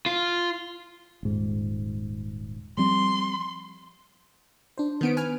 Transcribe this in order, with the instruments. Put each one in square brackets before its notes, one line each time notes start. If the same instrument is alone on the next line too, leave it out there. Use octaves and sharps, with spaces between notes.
[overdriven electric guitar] F4
[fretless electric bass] D#1 G#2
[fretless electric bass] F3 G3 C4 [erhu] C6
[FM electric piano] D4 C5
[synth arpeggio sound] D#3 B3 D7
B4 G#5 F6